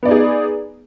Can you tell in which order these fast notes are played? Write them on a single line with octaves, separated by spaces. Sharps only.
B3 D5 D#4 G#4